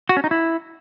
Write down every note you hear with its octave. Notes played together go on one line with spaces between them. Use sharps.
F#4
C#4
D#4
E4